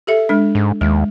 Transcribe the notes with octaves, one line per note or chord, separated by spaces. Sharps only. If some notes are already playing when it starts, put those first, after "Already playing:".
G4 A4 E5
G#3 D4
G#2
D#2 G#3